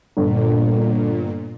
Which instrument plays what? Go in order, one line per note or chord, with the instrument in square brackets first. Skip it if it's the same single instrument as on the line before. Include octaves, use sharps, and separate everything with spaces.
[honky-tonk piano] G1 [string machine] A#2